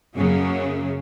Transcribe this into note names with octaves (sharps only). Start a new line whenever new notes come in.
F#2 C#3 F#3 A#3